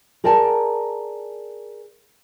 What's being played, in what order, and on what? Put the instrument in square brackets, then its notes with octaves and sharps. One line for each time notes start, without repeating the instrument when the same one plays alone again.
[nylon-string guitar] G#4 A#4 D5 G5 A5